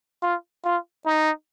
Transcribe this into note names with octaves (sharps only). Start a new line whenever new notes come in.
F4
F4
D#4